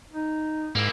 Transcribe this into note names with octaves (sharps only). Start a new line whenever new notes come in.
D#4
G#2 A#3 E4